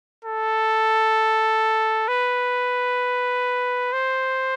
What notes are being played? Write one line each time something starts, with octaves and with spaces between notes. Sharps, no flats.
A4
B4
C5